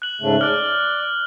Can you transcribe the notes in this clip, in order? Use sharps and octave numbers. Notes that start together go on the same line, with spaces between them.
F#6 F#7
G#2 C#3 A3
D5 F6 F#6